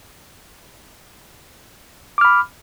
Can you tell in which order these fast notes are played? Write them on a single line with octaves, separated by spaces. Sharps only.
D6 F6 B5